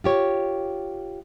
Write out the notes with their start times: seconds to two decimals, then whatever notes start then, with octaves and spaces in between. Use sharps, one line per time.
0.04 F4 G4 C#5